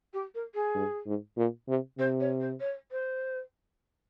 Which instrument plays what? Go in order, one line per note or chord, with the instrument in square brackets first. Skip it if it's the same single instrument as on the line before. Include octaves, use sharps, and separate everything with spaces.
[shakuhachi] G4
A#4
G#4
[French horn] G2
G#2
A#2
C3
[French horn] C3 [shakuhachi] C5
[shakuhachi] C#5
C5
C#5
C5